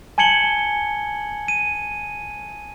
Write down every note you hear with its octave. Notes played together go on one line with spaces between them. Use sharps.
G#5 A5 G#6 C#7 F#7 G7
D#7